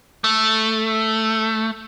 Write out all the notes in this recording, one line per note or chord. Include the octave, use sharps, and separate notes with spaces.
A3